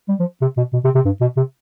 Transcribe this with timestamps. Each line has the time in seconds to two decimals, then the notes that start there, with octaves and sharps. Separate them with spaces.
0.09 G3
0.20 F3
0.42 C3
0.57 B2
0.73 B2
0.84 C3
0.95 C3
1.05 G2
1.21 B2
1.37 C3